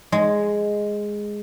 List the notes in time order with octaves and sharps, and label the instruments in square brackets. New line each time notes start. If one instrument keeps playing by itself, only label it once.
[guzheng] G#3